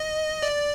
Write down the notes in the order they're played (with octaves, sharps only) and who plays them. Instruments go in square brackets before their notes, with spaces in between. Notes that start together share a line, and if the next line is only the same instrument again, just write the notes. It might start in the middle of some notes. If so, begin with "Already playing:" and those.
Already playing: [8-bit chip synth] D#5
D5